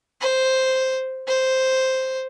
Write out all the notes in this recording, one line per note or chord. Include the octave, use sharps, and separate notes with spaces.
C5
C5